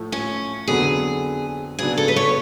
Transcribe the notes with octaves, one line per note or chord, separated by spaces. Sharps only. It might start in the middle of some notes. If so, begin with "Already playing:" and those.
Already playing: A2 F3 A3
C#4
F2 D3 F#3 B3 G#4
C#3 F#3 B3 D4 G#4
A4
B4
C#5